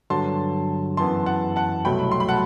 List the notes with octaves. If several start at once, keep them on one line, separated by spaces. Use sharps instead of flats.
G2 D3 F#3 A5 C6
F#2 E3 B3 A5 C6
F#5 A5
F#5 A5
C2 B2 F#3 A3 G5 B5
C6
B5
F#5 A5